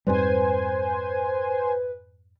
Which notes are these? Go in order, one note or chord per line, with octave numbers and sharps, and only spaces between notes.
F2 G#2 G3 B4 C5 G#5